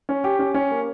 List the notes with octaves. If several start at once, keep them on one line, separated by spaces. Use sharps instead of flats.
C#4
G4
C#4
C#4
A#3